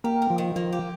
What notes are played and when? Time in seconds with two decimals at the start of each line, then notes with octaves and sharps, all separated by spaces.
0.04 A#3 G4
0.22 A#4
0.30 F3
0.38 D#3
0.56 F3 A#3
0.73 G4